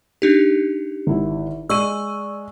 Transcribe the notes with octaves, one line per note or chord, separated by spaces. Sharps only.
D4 D#4 G4
G#1 E4
G#3 D5 C#6 E6 D#7